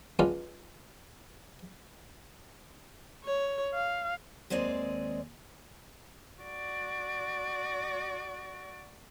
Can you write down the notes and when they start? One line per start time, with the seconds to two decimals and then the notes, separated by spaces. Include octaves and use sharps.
0.19 G#3 B3 C#4 D4 F4
3.25 C#5
3.74 F5
4.50 D#2 G#3 C4 G#4 D5 D#5
6.42 F#4 D5